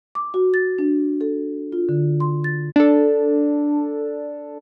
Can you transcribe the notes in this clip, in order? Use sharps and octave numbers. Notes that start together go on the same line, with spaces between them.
D6
F#4
A6
D4
A4
F4
D3
C6
A6
D4 A4